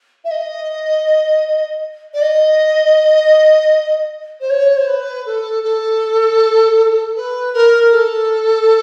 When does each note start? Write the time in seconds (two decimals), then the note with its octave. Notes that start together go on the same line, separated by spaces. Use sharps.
0.24 E5
0.30 D#5
2.13 D5
2.21 D#5
4.40 C5
4.49 C#5
4.76 C5
4.87 B4
5.25 A4
5.63 A4
7.15 B4
7.53 A#4
7.91 A4